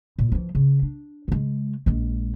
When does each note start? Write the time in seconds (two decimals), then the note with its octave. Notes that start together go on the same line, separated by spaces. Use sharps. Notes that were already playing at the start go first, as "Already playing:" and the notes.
0.19 A#2
0.32 E3 F3
0.55 C#3
0.82 D4
1.28 C#3 G#3
1.86 A#1 G#3